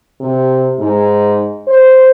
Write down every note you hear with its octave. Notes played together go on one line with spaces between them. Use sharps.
C3
G#2
C5